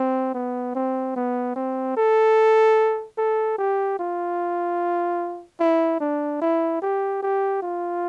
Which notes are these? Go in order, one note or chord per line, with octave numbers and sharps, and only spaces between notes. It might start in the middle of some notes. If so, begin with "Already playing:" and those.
Already playing: C4
B3
C4
B3
C4
A4
A4
G4
F4
E4
D4
E4
G4
G4
F4